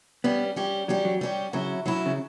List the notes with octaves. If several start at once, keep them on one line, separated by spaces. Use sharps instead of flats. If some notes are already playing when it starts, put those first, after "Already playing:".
G3 B3 C#4 G4
G3 C#4 G4
F#3 G3 C#4 G4
F#3
G3 C#4 G4
C#3 F#3 C#4 E4
F#3 C#4 E4
C#3